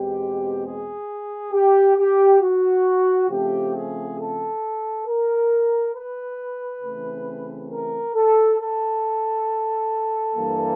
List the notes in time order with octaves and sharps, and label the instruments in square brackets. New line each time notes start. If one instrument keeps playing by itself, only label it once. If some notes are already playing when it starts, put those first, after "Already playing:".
Already playing: [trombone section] E2 B2 G#3 C4 G4
G#4
G4
G4
F#4
C#3 F3 A3 C4 G4
G#4
A4
A#4
B4
C#3 E3 A3 C4
A#4
A4
A4
G2 E3 G3 A#3